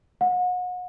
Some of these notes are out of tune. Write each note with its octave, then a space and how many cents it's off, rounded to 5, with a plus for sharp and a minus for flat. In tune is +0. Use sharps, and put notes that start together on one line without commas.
F#5 -35